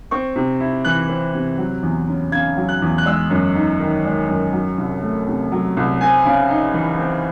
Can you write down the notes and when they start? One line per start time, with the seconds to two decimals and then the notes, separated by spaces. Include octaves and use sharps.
0.11 C4 C#6
0.36 C3
0.60 E4
0.85 E3 F#6
1.09 C4
1.34 C3
1.58 F#3
1.83 E2
2.08 C#4
2.32 C#3 G#6
2.57 F#3
2.69 F#6
2.82 E2
2.98 F#6
3.06 G#3 E6
3.30 F#2
3.55 D#4
3.80 D#3
4.05 G#3
4.29 F#2
4.53 F#3
4.78 C2
5.02 A3
5.27 C3
5.52 F#3
5.77 C2
6.01 C4 G#5
6.26 C#3
6.50 D#4
6.74 E3
6.98 C4